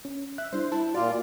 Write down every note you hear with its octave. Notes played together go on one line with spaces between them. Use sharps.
C#4
E5 F#6
G3 D4 E4 C5
E4 A5
A#2 F4 F#4 D5